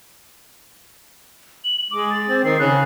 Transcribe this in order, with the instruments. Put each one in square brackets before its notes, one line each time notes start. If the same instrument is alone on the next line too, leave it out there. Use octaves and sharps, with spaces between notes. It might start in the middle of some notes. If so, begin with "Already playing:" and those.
[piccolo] F#7
[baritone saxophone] G#3 [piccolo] D6
[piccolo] A6
[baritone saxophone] C4
[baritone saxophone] D#3 [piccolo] C7
[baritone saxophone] C#3 [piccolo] F#6